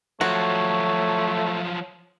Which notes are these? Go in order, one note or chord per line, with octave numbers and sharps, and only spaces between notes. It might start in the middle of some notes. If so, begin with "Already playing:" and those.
F3 F#3 A3 F#4 C#5